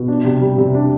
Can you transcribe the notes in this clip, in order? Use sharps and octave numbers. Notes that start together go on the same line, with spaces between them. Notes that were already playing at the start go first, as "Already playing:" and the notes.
Already playing: B2
D4
C3
G3
C3
D4